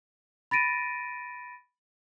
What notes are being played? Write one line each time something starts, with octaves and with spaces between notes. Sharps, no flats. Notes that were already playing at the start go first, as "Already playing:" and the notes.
B5 A6 A#6 D7 D#7